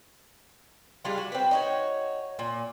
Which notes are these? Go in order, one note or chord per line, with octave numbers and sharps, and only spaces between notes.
G3 G#3 D4 F4
F#4
C4 B4
D#4 F#4 C#5
A#2